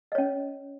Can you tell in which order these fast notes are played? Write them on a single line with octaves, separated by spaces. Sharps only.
D#5 C#5 C#4